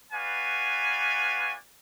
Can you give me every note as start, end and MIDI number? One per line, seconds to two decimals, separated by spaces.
0.13 1.54 59
0.13 1.54 66
0.13 1.54 71
0.13 1.54 74
0.13 1.54 77
0.13 1.54 80